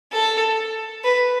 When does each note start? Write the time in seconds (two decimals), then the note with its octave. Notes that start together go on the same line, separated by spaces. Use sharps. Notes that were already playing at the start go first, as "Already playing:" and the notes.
0.12 A4
1.04 B4